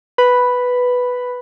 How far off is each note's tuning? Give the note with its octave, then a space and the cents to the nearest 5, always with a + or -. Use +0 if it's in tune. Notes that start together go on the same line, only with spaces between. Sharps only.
B4 +0 B5 +0